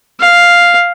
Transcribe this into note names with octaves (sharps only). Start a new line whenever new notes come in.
F5